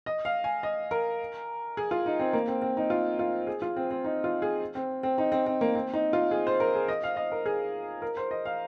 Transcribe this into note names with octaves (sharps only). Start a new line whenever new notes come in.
D#5
F5
G#5
D#5
A#4
G#4
F4
D#4
C4
A#3
C4
C4
D#4
F4
F4
G#4
F4
C4
C4
D#4
F4
G#4
C4
C4
D#4
C4
C4
A#3
C4
D#4
F4
G#4
C5
A#4
G#4
D#5
F5
D#5
A#4
G#4
A#4
C5
D#5
F5